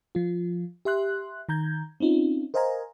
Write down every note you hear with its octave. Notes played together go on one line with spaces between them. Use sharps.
F3 F4
G4 E5 C6 F#6
D#3 A#5 G6 G#6
C4 C#4 D#4 F4
A#4 C5 D#5 F5 G#5 A#5